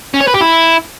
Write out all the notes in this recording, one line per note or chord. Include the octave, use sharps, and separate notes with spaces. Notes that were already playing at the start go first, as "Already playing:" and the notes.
C#4
C#5
B4
G4
E4